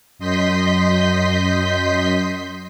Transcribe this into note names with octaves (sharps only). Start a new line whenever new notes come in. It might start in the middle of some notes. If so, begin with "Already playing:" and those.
F#2 D#5 C6 G6 B6